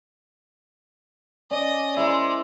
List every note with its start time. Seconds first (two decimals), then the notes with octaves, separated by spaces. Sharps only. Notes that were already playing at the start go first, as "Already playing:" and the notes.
1.51 C#4 D5 D#5
1.97 G#3 E4 A#4 C5